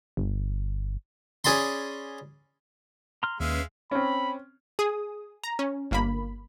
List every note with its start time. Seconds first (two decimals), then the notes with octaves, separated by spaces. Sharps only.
0.17 G1
1.44 C#4 G#4 D5 B5 C6
3.23 A#5 C6 F6
3.40 D#2 G#3 C#4 B4 E5 F5
3.91 C4 C#4 B5
4.79 G#4 D#6
5.44 A#5
5.59 C#4
5.91 G1 A#3 B5